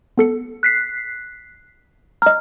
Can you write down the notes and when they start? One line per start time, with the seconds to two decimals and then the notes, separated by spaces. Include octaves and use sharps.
0.18 B3 A4 C#7
0.63 F#6 B6 C7
2.22 D#5 A#5 F6